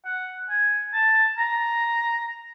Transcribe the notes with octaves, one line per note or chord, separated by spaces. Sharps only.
F#5
G#5
A5
A#5